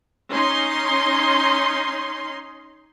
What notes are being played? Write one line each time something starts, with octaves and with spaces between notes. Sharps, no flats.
C#4 D#4 C6